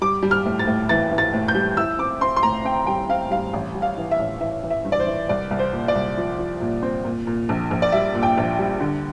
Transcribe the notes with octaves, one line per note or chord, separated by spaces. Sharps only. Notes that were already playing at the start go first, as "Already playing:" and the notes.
G3 D6
G3
F6
A2
A6
A2
E3 A6
E3
A6
A2
G6
G3
E4 E6
C4 D6
C4 C6
C6
A2 A#5
C4 G5
G3 G5
C4 F5
G3 F5
A1
G3
F5
E3
E5
A1
E3 E5
E3
E5
G2
D5
C5
E3
C2 D5
C2
C5
A#2
D5
C2
F3
F3
A#2
C4
A#2
A#2
A#1
A#1
D5
G3 E5
A#2
G5
A#1
G3
D3